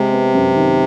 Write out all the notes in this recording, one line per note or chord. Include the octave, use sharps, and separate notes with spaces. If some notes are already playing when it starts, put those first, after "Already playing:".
Already playing: C3 G#3
B3
F#2
D#3